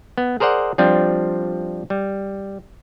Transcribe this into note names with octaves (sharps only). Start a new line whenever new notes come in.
B3
G#4 A#4 C5 D5 F#5
F3 G3 C4 D4 F4
G3